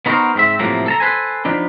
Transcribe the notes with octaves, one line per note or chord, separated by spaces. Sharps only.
B3 D#4 F#4 A4 A#4 C5
G#2 C4 E5
A2 C3 F3 F#3 A3 A#3
A4 A5 A#5
A4 B4 C5 G#5
F3 B3 D4 D#4